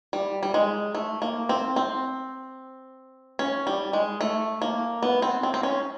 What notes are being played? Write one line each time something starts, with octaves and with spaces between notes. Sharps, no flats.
G3
G3
G#3
A3
A#3
C4
C4
C#4
G3
G#3
A3
A#3
B3
C4
C4
C4
C#4